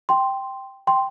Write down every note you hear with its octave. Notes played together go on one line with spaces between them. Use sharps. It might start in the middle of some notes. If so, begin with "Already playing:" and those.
G5 C6
G5 C6